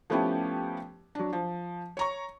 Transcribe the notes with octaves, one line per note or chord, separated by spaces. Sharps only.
F3 A3 B3 C#4 E4 G4
F#3 D4
F3
C#5 A#5 C#6